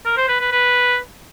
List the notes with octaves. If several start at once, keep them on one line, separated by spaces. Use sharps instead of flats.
A#4
C5
B4
B4
B4